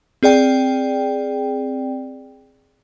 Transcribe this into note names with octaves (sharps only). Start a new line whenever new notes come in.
C4 G#4 D5 G5